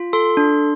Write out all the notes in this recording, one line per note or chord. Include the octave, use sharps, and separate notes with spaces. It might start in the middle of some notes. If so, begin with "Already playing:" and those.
Already playing: F4
A4 C6
D4